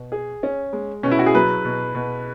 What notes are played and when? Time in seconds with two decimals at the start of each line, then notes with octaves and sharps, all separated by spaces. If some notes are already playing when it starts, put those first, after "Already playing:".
Already playing: B2
0.12 G#4
0.43 C#4
0.73 G#3
1.03 B2 C#4
1.11 E4
1.19 F#4
1.26 G#4
1.35 F#3 B4
1.65 B2
1.95 B2